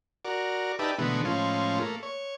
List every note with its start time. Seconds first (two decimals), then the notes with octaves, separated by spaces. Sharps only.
0.25 F#4 A#4 D5
0.79 D#4 G4 B4 D5 E5 A5
0.99 B2 D3 E3 G#3 A3 B3
1.25 A2 F3 G#3 C#4 F4
1.79 A3 A#3
2.03 C#5